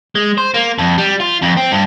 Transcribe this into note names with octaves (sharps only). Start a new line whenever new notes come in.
G#3
C5
A#3
F2
G3
F4
F2
C4
G2